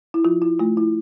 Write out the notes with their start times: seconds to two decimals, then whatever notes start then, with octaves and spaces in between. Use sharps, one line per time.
0.14 E4
0.25 F3 F4
0.42 E4
0.59 A3 F4
0.77 E4